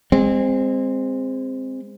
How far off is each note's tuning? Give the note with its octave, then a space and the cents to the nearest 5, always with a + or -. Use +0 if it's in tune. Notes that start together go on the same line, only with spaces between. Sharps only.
G#3 -30 C4 +0